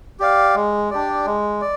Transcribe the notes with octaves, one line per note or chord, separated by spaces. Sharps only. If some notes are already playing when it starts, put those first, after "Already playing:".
G4 D5 F5
G#3
D4 G4 D5
G#3
D5